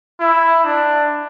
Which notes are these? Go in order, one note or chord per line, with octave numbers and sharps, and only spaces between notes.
E4
D4